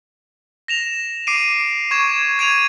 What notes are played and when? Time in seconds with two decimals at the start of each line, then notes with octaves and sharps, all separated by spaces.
0.68 A#6 E7 F7
1.27 D6 C7 D7 D#7
1.91 C#6 G#6 E7
2.39 G#6 D7 D#7 F7